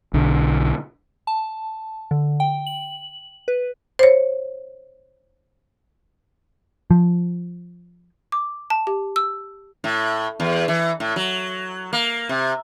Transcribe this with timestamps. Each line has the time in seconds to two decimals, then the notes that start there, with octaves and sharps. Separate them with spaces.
0.14 B1 D3
1.27 A5
2.11 D3
2.40 G5
2.66 F#7
3.48 B4
3.99 C5 C#5
6.91 F3
8.32 D6
8.70 A5
8.87 G4
9.16 E6
9.84 A2
10.40 E2
10.68 E3
11.00 A2
11.16 F#3
11.93 A#3
12.29 C3